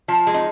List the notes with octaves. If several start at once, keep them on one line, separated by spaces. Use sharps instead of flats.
F3
G#3
D#4